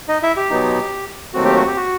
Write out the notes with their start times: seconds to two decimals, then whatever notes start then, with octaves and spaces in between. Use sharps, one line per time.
0.08 D#4 D#5
0.22 E4 E5
0.37 G4
0.50 B2 F#3 B3 D#4
1.34 D#2 D#3 F#3 A3 C4 F#4
1.44 G4
1.56 F#4
1.67 G4
1.77 F#4